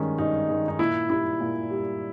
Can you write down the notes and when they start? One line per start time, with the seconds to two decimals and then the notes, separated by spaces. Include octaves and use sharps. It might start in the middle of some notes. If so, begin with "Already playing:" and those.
Already playing: G2 D#3 G#3 C#4
0.18 G2 D#4
0.49 D#3 G#3
0.68 D#4
0.79 A#2 E4
1.10 G3 E4
1.40 A#2
1.70 G3